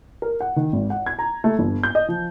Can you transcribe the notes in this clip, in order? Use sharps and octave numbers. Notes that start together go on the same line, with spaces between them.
A#4
F#5
D#3
G#1
F#5
G#6
A#5
A3
G1
G6
D#5
F3